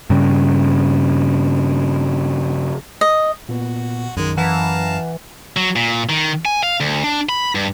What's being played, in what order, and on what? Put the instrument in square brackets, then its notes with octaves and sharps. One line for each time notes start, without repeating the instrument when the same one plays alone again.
[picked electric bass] G2 C#3
[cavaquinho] D#5
[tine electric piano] A#2 B3 [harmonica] F#4
[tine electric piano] A#1 D#3 [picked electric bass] F#2 [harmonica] G#3
[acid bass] E3 [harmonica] F5 A5 A#5 [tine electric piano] F#5
[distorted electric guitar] F#3
A#2
D#3
G#5
F5
D2
D4
B5
G2